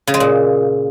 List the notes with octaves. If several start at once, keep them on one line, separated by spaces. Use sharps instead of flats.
C#3
G#3
A#2